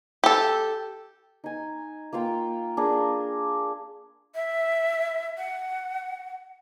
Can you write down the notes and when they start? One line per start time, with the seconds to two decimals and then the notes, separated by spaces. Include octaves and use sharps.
0.24 G4 A4
1.44 D#4 G#5
2.13 A#3 F4 F5 G5
2.77 D4 G#4 A#4
4.35 E5
5.38 F#5